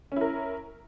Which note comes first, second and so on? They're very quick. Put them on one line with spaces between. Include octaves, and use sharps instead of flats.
C#4 E4 A#4